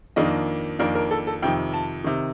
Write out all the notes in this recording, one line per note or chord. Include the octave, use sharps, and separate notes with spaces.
F2 D#3 A#3 D4 D#5
F2 D#3 A#3 D4 A#4
A#4
A4
A4
F2 C3 D#3 G5
A5
C3 D#3